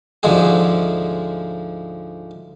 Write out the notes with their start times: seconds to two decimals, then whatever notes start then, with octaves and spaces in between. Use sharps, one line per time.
0.23 D2 G#2 F3 G#3 F#4 G#4